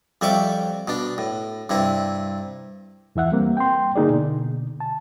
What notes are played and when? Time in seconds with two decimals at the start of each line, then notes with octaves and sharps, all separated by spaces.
0.21 F2 G3 E5 C#6 D6
0.88 B2 D4
1.18 A2
1.70 G2 C3 E4
3.16 E2 E3 E5 F#5
3.32 G3 A#3 C4
3.57 G5 C6
3.96 D3 A#3 D#4 G#4 D5
4.09 B2 D3
4.80 A5